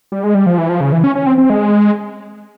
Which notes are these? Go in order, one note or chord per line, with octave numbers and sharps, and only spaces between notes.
G3
G#3
G3
F3
E3
F3
C#3
E3
C#4
C#4
C4
C4
G#3